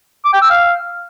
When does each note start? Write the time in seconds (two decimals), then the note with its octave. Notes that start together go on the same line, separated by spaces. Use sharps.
0.25 D6
0.33 G5
0.42 E6
0.50 F5